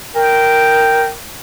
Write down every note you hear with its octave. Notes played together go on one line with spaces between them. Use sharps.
A#4 G5